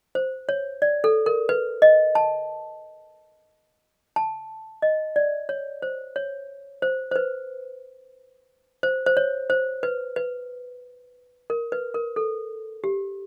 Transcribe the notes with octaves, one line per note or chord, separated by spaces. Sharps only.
C5
C#5
D5
A4
A#4
B4
D#5
A5
A5
D#5
D5
C#5
C5
C#5
C5
C5
B4
C5
C5
C#5
C5
B4
B4
A#4
B4
A#4
A4
G4